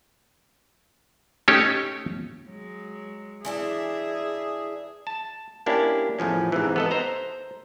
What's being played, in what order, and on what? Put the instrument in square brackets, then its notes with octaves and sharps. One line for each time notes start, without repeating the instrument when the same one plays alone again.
[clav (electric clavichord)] A3 C#4 D#4 G4 C#5
[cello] F#3 G#3
[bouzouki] E3 D4 E4 [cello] G#4 E5
[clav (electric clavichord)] A5
A#3 C#4 D4 E4 G4
E2 A2 F3 C#4
G#2 C3 E3
B3 A4 D#5
C5 A#5